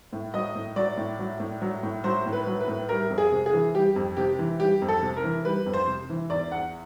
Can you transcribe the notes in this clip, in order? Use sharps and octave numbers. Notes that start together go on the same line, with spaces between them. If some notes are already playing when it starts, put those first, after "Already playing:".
A2
F#3 D#5
A2
F#3 D5
A2
F#3
A2
F#3
A2
F#3 C5
A2
B4
F#3
B4
A2
G3 A#4
F2
G#4
C3
G#4
E3
G3 G4
F2
C3 G4
E3
G3 G4
F2
A4
C3
A#4
E3
G3 B4
F2
C5
C3
E3
E2 D5
E2 F#5